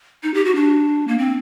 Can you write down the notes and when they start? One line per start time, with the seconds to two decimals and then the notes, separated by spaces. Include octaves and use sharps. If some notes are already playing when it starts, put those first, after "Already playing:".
0.23 D#4
0.34 G4
0.45 F#4
0.55 D4
1.08 A#3
1.18 C4